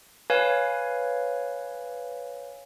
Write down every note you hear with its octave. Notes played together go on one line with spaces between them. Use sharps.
B4 C#5 F5 G#5